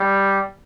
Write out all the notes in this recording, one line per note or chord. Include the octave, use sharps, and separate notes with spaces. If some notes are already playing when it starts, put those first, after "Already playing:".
Already playing: G3